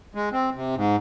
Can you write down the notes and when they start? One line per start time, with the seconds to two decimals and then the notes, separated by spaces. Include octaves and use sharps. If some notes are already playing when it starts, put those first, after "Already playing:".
0.15 G#3
0.32 C4
0.55 C3
0.76 G#2